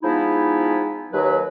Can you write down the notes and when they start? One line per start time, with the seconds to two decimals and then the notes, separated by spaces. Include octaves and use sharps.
0.03 F3 G#3 B3 D#4 E4
1.13 D#2 F#3 B4